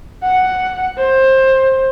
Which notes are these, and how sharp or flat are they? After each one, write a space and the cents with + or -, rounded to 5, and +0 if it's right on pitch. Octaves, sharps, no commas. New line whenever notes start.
F#5 +5
C5 +20